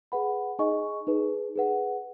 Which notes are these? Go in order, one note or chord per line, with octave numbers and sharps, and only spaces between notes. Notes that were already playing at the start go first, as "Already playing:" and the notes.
G#4 B4 F#5 B5
D#4 G#4 D#5 G#5 C#6
D#4 G#4 B4
G#4 B4 F#5